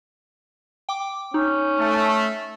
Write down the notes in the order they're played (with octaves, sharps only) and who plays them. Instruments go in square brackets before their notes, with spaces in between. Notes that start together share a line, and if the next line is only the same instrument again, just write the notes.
[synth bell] G5 D6
[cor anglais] C#4 [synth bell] D#4
[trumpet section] A3